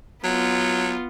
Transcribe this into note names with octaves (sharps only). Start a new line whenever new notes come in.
F#3 B3 F4